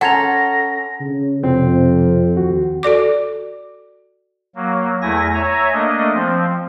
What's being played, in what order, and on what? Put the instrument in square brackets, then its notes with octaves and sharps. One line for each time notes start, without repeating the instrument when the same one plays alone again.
[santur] C#4 A#5 C6 [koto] A4 [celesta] F#5 G#6 F7 [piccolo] A#6
[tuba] C#3
[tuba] F2 [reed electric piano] C3 [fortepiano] C4
[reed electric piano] D#2 F#4
[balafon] F#4 A4 D5 D6
[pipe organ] F#3 A#3
E2 A3 E4 G#5 A#6
C#5 E5 G#5 A#5
A3 A#3 D4 D#5
F3 C4